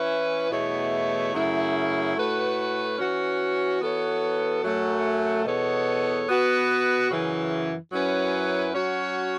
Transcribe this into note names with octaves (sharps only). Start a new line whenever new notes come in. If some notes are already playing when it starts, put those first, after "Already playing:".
Already playing: E3 C#4 E4 B4
E2 B2 A3 E4 C#5
F#2 C#3 A3 E4
A2 A3 F#4 B4
E3 C#4 F#4
E3 B3 F#4 A4 C#5
F#2 F#3 A3 C#4
E2 B2 B3 A4 C#5
B2 B3 F#4 B4
F#2 C#3 E3
F#2 F#3 C#4 E4 B4
F#3 C#4 F#4 C#5